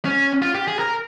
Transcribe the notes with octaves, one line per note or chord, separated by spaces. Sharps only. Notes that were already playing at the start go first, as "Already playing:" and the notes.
C#4
F4
G4
G#4
A#4